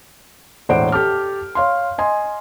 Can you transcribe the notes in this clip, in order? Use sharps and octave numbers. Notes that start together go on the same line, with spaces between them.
E1 A2 C5 D5 F#5 D7
G4 A4 A5 D6 F6
C#5 F5 C6
D#5 G#5 C6